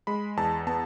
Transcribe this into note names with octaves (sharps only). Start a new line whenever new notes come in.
G#3 B5
E2 A5
B3 A5